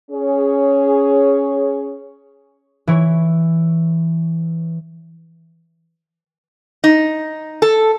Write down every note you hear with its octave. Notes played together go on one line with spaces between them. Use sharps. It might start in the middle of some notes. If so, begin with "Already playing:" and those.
C#4 G#4 C#5
E3 E4 C#5
D#4
A4